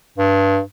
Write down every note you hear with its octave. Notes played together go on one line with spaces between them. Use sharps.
G2